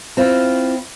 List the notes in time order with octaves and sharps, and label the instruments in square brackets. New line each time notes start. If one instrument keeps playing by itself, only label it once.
[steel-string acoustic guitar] C4 E4 F4